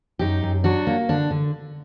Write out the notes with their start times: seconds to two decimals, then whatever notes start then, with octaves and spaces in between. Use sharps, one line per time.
0.19 F#2 D#4 G4
0.43 F#2
0.64 F#3 D4 F#4
0.87 A#3
1.09 D3 D4
1.31 D3